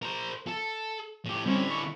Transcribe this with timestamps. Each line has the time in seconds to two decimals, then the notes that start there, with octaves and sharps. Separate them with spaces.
0.02 A#4 C5
0.47 A4
1.26 A2 G4
1.46 D3 G3 C4 C#4 E4
1.70 C#6